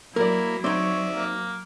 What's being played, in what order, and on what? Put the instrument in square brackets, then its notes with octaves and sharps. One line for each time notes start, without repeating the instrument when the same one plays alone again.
[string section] F#3 [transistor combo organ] A#3 [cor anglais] E4 [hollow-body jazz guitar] A#4 D5
[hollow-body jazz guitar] C4 D#4 [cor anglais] C#5 [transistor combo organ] D5 E5
[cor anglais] A#3